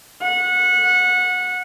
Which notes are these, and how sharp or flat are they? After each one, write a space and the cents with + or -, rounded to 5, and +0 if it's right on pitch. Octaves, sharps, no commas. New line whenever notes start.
F#5 -20